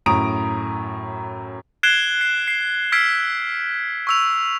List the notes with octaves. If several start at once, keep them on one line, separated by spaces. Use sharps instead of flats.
F#2 A2 A#5 D#6 D7
F#6 G#6 C7 D7 E7 G7
C7
C7
E6 F6 G#6 B6 C7 D7
C#6 E6 F7